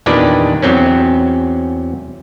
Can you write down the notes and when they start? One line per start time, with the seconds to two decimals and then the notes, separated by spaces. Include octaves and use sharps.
0.06 E2 A#2 D#3 D4 G4 B4
0.62 E2 F#3 C4 C#4